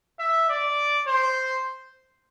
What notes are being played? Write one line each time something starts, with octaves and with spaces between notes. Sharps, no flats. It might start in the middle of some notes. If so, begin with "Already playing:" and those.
E5
D5
C5